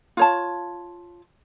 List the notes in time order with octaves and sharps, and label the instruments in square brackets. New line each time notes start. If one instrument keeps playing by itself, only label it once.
[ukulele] F4 C#5 A5